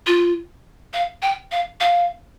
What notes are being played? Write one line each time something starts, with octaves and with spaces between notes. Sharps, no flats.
F4
F5
G5
F5
F5